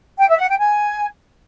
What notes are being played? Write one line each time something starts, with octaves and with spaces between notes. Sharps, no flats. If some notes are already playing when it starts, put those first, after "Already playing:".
G5
E5
F#5
G5
G#5